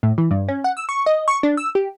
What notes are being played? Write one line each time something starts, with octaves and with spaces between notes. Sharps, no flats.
A2
E3
G2
C#4
F#5
E6
C#6
D#5
C#6
D4
E6
G4